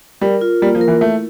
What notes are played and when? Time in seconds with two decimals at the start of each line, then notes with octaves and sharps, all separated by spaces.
0.21 G3 A#4
0.41 F4
0.62 G3 A#3
0.75 F3
0.81 A#4
0.88 E3
1.01 A3 E4